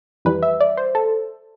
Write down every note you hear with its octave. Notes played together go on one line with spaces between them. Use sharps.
F2 E3 G3 B4
E5
D5
C5
A4